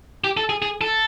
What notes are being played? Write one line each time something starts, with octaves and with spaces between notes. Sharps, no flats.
G4
A4
G#4
G#4
A4